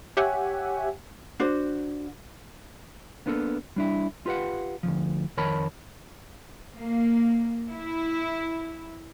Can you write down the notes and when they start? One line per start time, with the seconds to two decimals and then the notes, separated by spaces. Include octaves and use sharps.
0.17 G4 C#5 E5 F#5 G#5
1.40 D4 F#4 C5
3.26 A#3 B3 D4 F4 A4 A#4
3.76 G3 D4 E4
4.26 F4 G4 B4 F5 F#5
4.83 D2 A#2 F3
5.37 F2 D#3 A#4 C#5 A5 B5
6.75 A#3
7.69 E4